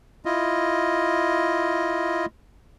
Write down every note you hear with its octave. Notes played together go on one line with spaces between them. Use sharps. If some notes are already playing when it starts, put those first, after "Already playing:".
E4 F4 D#5